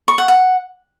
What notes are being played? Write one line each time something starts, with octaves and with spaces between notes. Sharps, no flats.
C#6
F#5
F#5